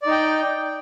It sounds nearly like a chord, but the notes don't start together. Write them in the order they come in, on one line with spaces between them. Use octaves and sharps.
D5 D#4 G5